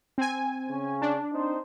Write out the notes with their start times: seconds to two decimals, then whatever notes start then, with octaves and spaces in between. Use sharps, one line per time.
0.18 C4 G#5
0.69 C#3 C#4
1.02 D4
1.33 C4 D#4 C5